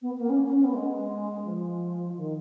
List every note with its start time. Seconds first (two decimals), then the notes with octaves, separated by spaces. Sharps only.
0.02 B3
0.16 B3
0.20 A#3
0.29 C#4
0.46 C#4
0.56 C#4
0.64 B3
0.74 G#3
1.45 F3
2.16 D#3